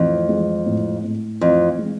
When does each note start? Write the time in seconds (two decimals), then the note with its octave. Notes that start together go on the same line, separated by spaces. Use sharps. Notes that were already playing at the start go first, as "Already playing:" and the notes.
Already playing: F2 A2 E3
0.29 G#3
0.66 A2
1.04 A2
1.41 F2 E3
1.79 G#3